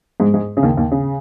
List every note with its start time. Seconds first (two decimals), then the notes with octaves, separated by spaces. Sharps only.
0.20 G#2 G#3
0.34 G#2 G#3
0.57 C#3
0.63 D#2 D#3
0.77 D#2 D#3
0.92 C#3